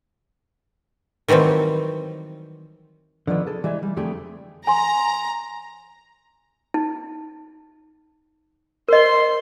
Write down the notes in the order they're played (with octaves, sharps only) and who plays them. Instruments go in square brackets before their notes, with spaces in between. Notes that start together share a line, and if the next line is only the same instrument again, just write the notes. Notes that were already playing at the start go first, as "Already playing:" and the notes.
[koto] D#3 E3 F#3 G3 C4
[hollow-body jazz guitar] D3 D#3 F3 B3
G#4 A4
E3 G3 G#3 E5 G#5
G3
F2 D3 A3 G4 G#4
[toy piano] G#5 C6 [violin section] A#5
[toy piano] D#4
[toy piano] A#4 D#5 [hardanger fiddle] C5 C6